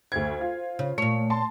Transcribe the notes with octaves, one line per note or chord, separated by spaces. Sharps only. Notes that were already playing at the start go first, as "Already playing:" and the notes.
D2 C5 G#6
F4
C#3
A#2 A3 C#5
A5 C6